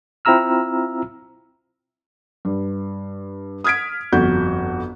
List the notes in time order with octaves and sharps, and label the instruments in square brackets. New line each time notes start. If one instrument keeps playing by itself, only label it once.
[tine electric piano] C4 E4 F4 A#5 E6 F6
[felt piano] G2
D#6 F6 G#6 B6 D7
G1 F2 F#4 G6